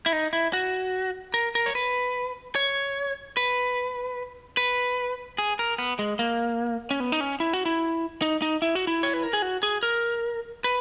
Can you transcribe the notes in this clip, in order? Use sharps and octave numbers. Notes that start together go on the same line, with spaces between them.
E4
D#4
E4
F#4
A#4
A#4
C#5
B4
C#5
B4
B4
G#4
A#4
B3
G#3
A#3
C#4
B3
D#4
C#4
E4
F#4
E4
D#4
D#4
E4
F#4
E4
C#5
B4
A#4
G#4
F#4
G#4
A#4
B4